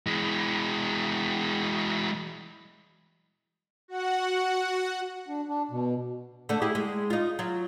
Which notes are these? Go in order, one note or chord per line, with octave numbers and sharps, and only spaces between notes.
E3 G#3
F#4 F#5
D4
D4
B2
D3 A3
E4 G4 G#4
G#3
D#4 F4
F#3 F4